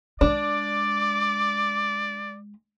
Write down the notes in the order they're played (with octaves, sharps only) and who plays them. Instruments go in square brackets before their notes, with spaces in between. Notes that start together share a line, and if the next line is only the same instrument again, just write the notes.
[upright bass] G#3 [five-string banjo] D4 [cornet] D5 [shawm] D6